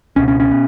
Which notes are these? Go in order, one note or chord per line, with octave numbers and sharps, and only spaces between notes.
C#2 B2 C#4
C#4
C#4
B2